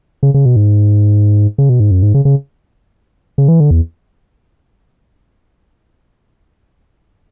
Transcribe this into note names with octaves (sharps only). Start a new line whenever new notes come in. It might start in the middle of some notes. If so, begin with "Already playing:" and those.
C#3
C#3
B2
G#2
C#3
B2
G#2
F#2
G#2
C#3
C#3
C#3
E3
D3
E2